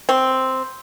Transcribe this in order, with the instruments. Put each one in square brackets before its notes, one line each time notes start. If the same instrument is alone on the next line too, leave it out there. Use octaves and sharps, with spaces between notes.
[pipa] C4